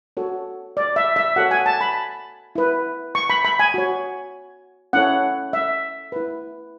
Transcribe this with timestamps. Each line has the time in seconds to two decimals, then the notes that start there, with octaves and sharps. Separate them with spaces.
0.17 F#4 A4 C#5
0.77 D5
0.96 E5
1.16 E5
1.36 F#4 A4 C#5 F#5
1.51 G#5
1.66 A5
1.81 B5
2.55 E4 B4
3.15 C#6
3.30 B5
3.45 B5
3.59 G#5
3.74 F#4 C#5
4.93 C#4 E4 A4 C#5 F#5
5.53 E5
6.12 E4 B4